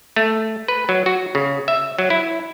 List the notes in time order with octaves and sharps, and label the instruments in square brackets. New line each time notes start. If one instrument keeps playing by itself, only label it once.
[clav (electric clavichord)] A3
B4
F#3
F#4
C#3
E5
F#3
E4